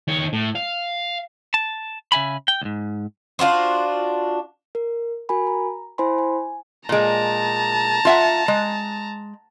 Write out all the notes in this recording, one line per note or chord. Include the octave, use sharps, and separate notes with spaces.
D#3 C#5
A2
F5
A5
C#3 E5 G#5 B5
G5
D2 G#2
D4 F4 F#4 C5
A#4
F#4 A#4 G#5 B5
A#5
E4 C5 G#5 B5 C6
G#5
A#2 G#3 A5 A#5
F4 E5 F#5
G#3